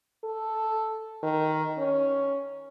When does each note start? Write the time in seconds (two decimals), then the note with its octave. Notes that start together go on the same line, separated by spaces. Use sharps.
0.24 A4
1.23 D#3
1.78 C#4